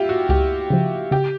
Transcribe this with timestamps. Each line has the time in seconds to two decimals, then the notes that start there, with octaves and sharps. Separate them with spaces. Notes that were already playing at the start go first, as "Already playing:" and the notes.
Already playing: E4 F4 G4
0.09 F#4
0.29 C#2 G4
0.70 C#3 F3
1.11 C#3 G4